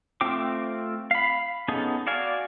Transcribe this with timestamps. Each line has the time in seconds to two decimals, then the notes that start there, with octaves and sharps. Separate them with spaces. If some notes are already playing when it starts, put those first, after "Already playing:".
0.21 A3 C4 F4 G5 D6
1.11 F5 B5
1.68 B3 C#4 D#4 G#4 A4
2.07 F#4 D5 F5 G#5